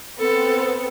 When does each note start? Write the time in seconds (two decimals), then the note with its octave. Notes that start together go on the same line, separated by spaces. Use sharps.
0.19 B3 C4 A4